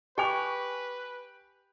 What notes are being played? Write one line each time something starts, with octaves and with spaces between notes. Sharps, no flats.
G4 B4 G5 G#5 C#6 D6 F7